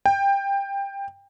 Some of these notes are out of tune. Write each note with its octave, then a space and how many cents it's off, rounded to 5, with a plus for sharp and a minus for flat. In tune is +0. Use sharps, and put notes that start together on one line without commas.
G5 +20